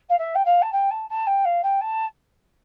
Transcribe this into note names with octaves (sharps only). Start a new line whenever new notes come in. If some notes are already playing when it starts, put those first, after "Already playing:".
F5
E5
G5
F5
A5
G5
A5
A5
G5
F5
G5
A5